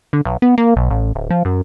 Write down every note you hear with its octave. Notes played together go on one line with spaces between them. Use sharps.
D3
B1
B3
A#3
B1
A1
D1
F3
F#2